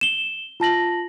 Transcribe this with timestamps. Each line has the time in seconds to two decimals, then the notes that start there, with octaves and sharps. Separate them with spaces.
0.01 E7 G7
0.60 F4 A5 A#6 F#7